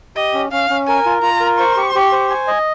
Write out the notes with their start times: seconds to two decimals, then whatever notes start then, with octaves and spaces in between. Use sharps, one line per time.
0.16 G4 D#5
0.34 C#4
0.52 C#4 F5
0.70 C#4
0.88 A#4 G#5
1.06 F4
1.23 F4 A#5
1.40 A#4
1.58 C5 C#6
1.77 G4
1.95 G4
2.12 C5
2.30 G#5
2.47 D#5